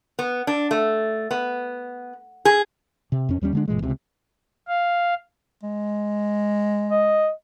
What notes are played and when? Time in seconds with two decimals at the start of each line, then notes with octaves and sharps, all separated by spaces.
0.19 B3
0.47 D4
0.71 A3
1.31 B3
2.45 G#4
3.12 C3
3.29 F2 C#4
3.41 D#2 G3 A3 C#4
3.53 D3 G#3 D4
3.68 F#1 A#2 E3 G#3
3.82 C#2 C3
4.68 F5
5.63 G#3
6.90 D#5